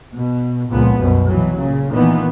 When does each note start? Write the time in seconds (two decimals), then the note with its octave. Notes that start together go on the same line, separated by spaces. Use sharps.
0.13 B2
0.70 C#2 A#2 F3 B3
0.98 C2 F#2 B2
1.27 B2 E3 F#3
1.58 A#2 C#3
1.91 A#2 D#3 E3 B3